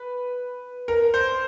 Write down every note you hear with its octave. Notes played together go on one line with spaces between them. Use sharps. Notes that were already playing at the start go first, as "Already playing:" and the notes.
Already playing: B4
A#4
C5